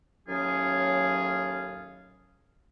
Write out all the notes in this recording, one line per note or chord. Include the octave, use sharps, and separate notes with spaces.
D#2 A2 F#3 C#4 F4 G#4